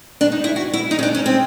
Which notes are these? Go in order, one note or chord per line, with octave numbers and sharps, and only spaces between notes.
D4
D#4
E4
F#4
E4
D#4
C#4
D4
C#4
C4